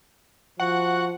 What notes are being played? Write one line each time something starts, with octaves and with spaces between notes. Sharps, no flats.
F3 F#4 F#5 F#6